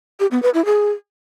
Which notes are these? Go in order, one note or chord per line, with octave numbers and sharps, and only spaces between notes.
G4
B3
B4
E4
G#4